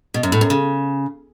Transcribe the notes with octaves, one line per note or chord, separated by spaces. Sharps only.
B2
F#2
A2
F#2
C#3